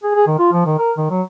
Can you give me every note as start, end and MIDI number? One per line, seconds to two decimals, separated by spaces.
0.03 0.13 68
0.15 0.25 68
0.27 0.34 51
0.39 0.51 65
0.53 0.64 53
0.66 0.78 51
0.79 0.92 70
0.97 1.06 51
1.10 1.22 54